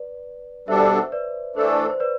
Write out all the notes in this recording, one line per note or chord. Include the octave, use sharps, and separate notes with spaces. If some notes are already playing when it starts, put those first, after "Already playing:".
Already playing: B4 D5
B2 G3 D4 A4 C5 E5
B4 D5
E3 A3 D4 A4 C5
D5
C5
C5
B4 D5